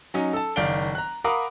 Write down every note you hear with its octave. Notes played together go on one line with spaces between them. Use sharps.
F#3 C#4 D#4
A4 A5
F#1 D#3 D5 F5 D7 G7
A#5 F#6
A#4 F5 F#5 B5 D6 D#6